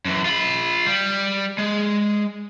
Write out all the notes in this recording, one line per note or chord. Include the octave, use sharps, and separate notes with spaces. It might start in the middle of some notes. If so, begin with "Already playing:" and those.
F#2 E3
F4 B5
G3
G#3